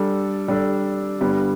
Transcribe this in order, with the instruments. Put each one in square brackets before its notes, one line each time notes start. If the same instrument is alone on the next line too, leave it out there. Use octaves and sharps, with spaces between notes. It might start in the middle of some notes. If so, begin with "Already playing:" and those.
Already playing: [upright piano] G3 D4 A4
G3 D4 A4
G2 D3 G3 B3